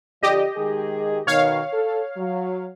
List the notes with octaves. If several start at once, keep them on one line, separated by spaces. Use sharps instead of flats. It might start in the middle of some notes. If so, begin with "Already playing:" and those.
D3 F3 G4 D5 D#5
D#3 G#3 G#4
B2 D#3 C#5 F5
A4
F#3